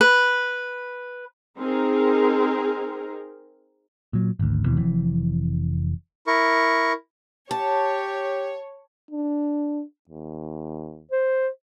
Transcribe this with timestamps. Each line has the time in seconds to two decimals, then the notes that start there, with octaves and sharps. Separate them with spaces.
0.01 B4
1.58 C4 D#4 G#4 A#4
4.13 A#2 F#3
4.39 G#1 D2
4.65 D#2 B2 E3
4.77 F1 F2 E3
6.27 E4 A#4 C#6
7.51 G4 C#5 A5
9.11 D4
10.09 D#2
11.11 C5